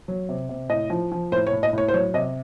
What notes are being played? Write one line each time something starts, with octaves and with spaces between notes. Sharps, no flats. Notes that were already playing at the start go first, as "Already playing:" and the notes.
F#3
C3
C3
A2 D#5
F3
F3
A2 C5
C#5
A2
D#5
A2 C#5
C5
F#3 C#5
C3 D#5